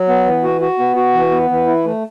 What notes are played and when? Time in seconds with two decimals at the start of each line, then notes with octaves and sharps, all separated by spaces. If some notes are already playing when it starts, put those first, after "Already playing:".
Already playing: F#3
0.08 B3
0.26 E3
0.44 F#4
0.61 F#4
0.79 B3
0.96 F#4
1.14 E3
1.31 B3
1.50 E3
1.67 E4
1.85 A3